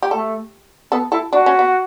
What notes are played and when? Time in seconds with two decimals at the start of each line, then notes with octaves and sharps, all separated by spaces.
0.02 G4
0.11 A3 A4
0.92 B3 A4
1.12 E4 A4
1.33 D4 F#4
1.46 C#4
1.59 B3